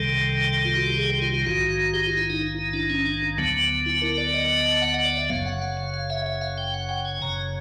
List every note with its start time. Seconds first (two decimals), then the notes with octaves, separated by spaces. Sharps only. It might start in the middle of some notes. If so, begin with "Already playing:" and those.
Already playing: C2 C3 D#3 G3 A4
0.65 F4
0.75 F#4
0.86 G4
0.97 G#4
1.10 G4
1.22 F4
1.34 F4
1.46 A#1 G#2 D#3 F#4
1.94 G4
2.06 F4
2.17 E4
2.30 D#4
2.41 E4
2.59 E4
2.73 D4
2.90 C#4
3.06 D4
3.38 D2 D3 F#3 B3
3.86 E4
4.02 A#4
4.18 D5
4.34 D#5
4.82 F#5
4.94 D#5
5.05 D5
5.17 E5
5.30 F#1 F#2 C#3 F5
5.46 F#5
5.62 F5
5.77 F5
5.94 F5
6.10 E5
6.26 E5
6.41 F5
6.58 G5
6.74 F#5
6.89 G5
7.05 G#5
7.22 F#1 F#2 C#3 A#5